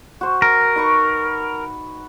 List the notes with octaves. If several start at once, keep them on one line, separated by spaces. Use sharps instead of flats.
F#4 C5
A#4
D#4 B4 C#6